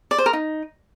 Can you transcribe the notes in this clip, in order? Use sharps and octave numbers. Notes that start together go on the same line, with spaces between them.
D5
C5
A#4
D#4